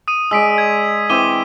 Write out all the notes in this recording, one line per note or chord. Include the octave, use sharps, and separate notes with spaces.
D#6 D#7
G#3 D5 E6 B6 D7
G#6
E3 C4 D6 D#7 G7